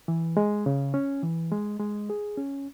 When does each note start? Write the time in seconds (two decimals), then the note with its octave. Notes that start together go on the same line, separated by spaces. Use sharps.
0.08 E3
0.37 G#3
0.66 C#3
0.94 C#4
1.23 E3
1.52 G#3
1.80 G#3
2.10 G#4
2.37 C#4